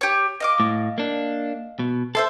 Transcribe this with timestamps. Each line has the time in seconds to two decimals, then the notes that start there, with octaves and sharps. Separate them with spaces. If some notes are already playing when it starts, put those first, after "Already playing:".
0.01 G4 C#5
0.40 D#5 F5 D6
0.60 A2
0.98 A#3 D4
1.79 B2
2.15 A4 C5 E5 C6